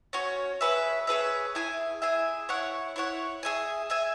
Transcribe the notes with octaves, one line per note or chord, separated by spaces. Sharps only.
C#4 F#4 C#5
C#4 G#4 B4 E5
C#4 G#4 B4 E5
E4 G#4 E5 G#5
E4 G#4 E5 G#5
E4 C#5 F#5
E4 C#5 F#5
G#4 E5 G#5
G#4 E5 G#5